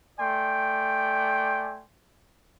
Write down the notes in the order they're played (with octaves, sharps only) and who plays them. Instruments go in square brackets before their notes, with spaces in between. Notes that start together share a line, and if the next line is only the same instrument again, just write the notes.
[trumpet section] A3 D5 G5 G#5 C6